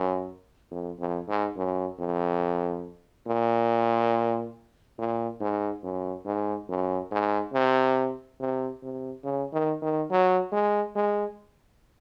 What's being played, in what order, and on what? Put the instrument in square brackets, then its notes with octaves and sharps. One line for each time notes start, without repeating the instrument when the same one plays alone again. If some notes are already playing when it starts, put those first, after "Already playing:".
Already playing: [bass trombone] F#2
F2
F2
G#2
F#2
F2
A#2
A#2
G#2
F#2
G#2
F#2
G#2
C3
C3
C3
C#3
D#3
D#3
F#3
G#3
G#3